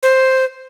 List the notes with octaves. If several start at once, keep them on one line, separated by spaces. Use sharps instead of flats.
C5